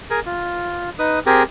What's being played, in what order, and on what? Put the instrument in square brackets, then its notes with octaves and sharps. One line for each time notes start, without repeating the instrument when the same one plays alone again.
[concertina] G#4 A#4
F4
D#4 B4 D#6
C4 G4 G#4 A#4